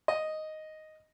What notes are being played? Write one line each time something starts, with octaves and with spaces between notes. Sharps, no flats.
D#5